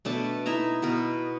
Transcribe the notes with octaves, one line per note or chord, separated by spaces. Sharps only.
B2 A3 D4 A5
D#4 E4 E5 A#5
B2 B3 A#4